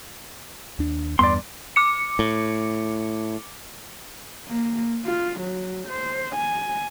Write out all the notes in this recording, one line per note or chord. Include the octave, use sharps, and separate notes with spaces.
D#2 D4
E2 G2 B3 D5 C6
D6 C#7
A2
A#3
F4
F#3
C5
G#5